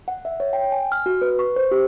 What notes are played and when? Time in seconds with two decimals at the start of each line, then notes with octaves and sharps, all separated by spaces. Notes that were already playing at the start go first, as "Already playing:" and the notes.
0.08 F#5
0.25 E5
0.40 C#5
0.53 G5
0.72 G#5
0.92 F6
1.06 F#4
1.22 B4
1.39 C#6
1.56 C5
1.71 G4